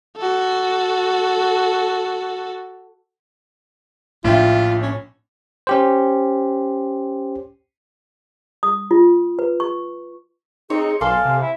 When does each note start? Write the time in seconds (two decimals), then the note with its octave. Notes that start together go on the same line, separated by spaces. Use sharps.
0.17 F#4 A4
4.24 A#1 A2 D4 F4 E5 G5
4.82 C#4
5.67 C#4 G4 C5
8.63 D#6
8.91 F4
9.39 B4
9.60 C#6
10.70 C4 D#4 G#4 C#5
11.01 B1 A4 D5 F5 G#5 C6
11.25 C3
11.41 E4